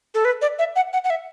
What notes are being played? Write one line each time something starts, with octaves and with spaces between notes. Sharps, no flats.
A4
B4
D5
E5
F#5
F#5
F#5
E5